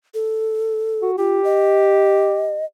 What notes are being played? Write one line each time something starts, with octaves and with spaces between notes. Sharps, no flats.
A4
F#4
F4 G4
D#5